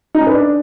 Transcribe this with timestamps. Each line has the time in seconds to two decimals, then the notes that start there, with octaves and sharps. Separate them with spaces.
0.15 D#4
0.21 C#4
0.27 B4
0.33 D4